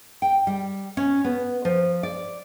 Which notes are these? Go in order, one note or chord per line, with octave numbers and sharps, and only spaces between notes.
G5
G3
C#4
B3
F3
D5